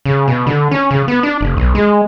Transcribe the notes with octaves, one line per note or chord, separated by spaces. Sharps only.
C#3
B2
D3
C#4
C#3
B3
D4
F1
B1
G#3